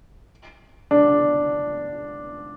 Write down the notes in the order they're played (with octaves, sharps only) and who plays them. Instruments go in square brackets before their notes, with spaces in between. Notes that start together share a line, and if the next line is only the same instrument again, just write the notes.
[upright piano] D4